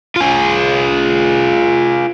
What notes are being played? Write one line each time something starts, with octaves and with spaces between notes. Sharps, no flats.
F4 G#4